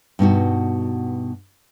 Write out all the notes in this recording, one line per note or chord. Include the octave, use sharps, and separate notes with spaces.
G2 B2 D#4 F#4